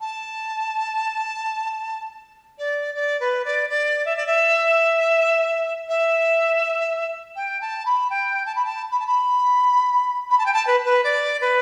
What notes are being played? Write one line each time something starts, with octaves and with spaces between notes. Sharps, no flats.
A5
D5
D5
B4
D5
D5
E5
D5
E5
E5
G5
A5
B5
G5
A5
B5
A5
B5
A5
B5
B5
A5
G5
A5
B4
B4
D5
B4